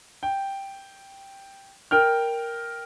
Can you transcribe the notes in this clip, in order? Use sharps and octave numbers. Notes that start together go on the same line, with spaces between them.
G5
A#4 G5 F6